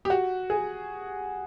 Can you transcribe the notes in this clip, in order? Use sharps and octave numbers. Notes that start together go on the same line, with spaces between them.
G4
F#4
G#4